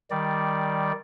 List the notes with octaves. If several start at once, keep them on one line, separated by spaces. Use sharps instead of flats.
D#3 G3 D5